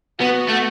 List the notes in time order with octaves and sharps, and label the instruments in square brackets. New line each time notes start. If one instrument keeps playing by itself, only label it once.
[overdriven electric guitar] B3 [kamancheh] F#4
[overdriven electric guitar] A3